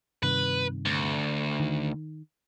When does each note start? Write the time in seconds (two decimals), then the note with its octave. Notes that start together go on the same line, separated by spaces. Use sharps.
0.23 G2 C3 D#3 B4
0.85 D2
1.60 D#3